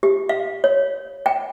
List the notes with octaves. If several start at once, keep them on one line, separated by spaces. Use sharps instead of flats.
G4
F5
C#5
G5